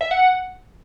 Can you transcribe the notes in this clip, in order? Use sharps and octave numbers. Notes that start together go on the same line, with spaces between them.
E5
F#5